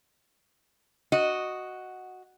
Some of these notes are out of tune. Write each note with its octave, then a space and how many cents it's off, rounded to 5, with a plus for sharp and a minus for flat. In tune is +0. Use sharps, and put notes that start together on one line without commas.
F#4 +0 D#5 +0